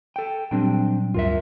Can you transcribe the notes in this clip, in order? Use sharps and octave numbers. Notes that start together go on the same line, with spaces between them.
A4 G5
A#2 F#3 G3 C4 D4 G5
D2 G2 F4 A#4 E5